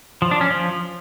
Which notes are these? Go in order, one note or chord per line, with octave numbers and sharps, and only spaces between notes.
F3
D4
C#4
F3